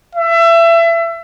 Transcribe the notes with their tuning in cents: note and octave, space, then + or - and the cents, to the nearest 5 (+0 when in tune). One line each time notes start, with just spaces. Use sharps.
E5 +25